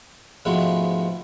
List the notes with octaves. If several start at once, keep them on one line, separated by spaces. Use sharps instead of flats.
G#2 B2 F3 G#3 A3 B3